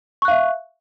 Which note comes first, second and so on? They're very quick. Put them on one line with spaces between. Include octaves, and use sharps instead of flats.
C#6 F#6 F5 E5